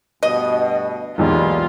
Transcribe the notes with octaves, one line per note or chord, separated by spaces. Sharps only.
D2 G2 B2 D#5
B1 E2 A#2 D#3 G3 G#3 F4